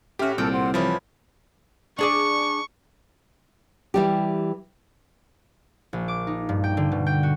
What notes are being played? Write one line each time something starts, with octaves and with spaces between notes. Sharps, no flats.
A2 C#4 F#4 G4 E5 F6
C2 A#2 A4 G5 F6
C5 F#5
C3 E3 F3 B3 C#5
D4 G#4 D5 C#6
E3 G3 G4
A#1
D6
D#4
G2
G5
D3
B2
G5
F#4